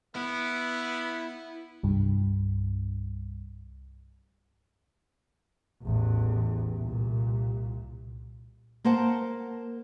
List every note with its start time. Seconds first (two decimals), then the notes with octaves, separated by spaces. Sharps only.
0.15 B3 E4
1.83 C2 G2
5.83 A1 E2
6.77 C2 A#2
8.85 A#3 A#4 C5 F#5 A5